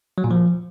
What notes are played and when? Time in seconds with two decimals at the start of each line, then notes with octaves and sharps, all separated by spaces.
0.18 F#3
0.24 A#2
0.31 F3